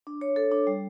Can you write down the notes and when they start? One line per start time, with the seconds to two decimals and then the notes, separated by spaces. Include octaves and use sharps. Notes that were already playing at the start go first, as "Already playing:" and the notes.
0.07 D4
0.21 C#5
0.36 A4
0.52 D4
0.67 G3